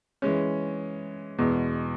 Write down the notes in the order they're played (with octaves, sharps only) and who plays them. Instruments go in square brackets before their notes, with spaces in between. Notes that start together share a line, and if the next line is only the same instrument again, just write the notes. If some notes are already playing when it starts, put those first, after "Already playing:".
[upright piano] E3 G#3 C#4
E2 B2 G#3